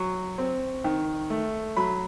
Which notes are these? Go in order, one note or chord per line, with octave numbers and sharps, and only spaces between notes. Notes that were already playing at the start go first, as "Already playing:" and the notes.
Already playing: F#3 C#6
C4
D#3
A3
F#3 B5